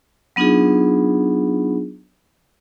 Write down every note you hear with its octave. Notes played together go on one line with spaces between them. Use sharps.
F#3 B3 D4 D#4 F4 G#4